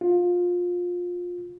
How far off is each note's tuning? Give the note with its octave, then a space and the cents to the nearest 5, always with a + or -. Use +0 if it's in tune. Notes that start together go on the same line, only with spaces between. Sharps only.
F4 +20